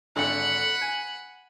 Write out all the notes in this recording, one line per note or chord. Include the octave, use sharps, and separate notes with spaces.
G#1 D3 F#5 B5
G#5